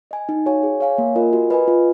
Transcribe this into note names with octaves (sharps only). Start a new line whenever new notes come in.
D#5 G#5
D#4
F#4 C#5 F5 G#5
G#4
C#5 F5 G#5
A#3
F4 A#4 D#5 G#5
F#4
B4 D#5 G#5
F4